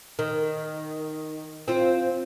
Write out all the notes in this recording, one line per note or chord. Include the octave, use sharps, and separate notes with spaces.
D#3
C4 F4